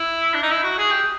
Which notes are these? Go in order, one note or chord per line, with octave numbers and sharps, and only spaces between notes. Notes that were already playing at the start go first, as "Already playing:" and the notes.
Already playing: E4
D4
D#4
E4
F#4
G#4
G4